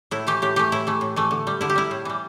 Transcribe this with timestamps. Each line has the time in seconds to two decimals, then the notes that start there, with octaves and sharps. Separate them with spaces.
0.11 A2 E4
0.27 E3 A3 G4
0.42 A2 G4
0.56 E3 A3 G4
0.72 A2 E4
0.87 E3 A3
1.01 A2
1.16 E3 A3
1.31 D3
1.47 G3
1.61 D3 E4
1.70 G4
1.75 G3 E4
1.91 A2
2.05 E3 G3